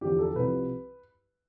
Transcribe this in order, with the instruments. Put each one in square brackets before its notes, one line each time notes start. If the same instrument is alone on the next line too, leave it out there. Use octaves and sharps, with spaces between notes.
[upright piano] E2 D3 F3 G4
A4
C2 C3 F3 B4